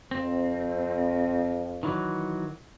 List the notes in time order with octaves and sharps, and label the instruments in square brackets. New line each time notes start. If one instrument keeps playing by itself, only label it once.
[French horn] F2 [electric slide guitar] C4
[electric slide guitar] D#3 E3 F#3